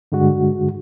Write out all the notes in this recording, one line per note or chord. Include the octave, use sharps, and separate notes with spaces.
G2 D3 G#3 F#4